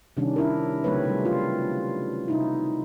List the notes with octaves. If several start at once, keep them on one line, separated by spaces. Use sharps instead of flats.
C3 D#3 G3 C#4 D4
D4 E4 A#4
C#3 F#3 A3 C4 B4 C#5
C3 G3
F4
C3 D#4 E4